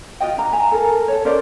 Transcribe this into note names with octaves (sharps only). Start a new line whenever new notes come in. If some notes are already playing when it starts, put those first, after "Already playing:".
F4 F#4 D#5 G5
D4 A#5
E4 G#5 A#5
A4 A#4
A4 C#5
C#4 A#4 C5 D5